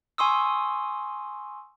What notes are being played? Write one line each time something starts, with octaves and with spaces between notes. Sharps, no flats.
G#5 C6 C#6 D#6 E6